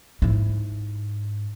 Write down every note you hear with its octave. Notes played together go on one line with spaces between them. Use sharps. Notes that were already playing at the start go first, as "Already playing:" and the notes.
G#2 E4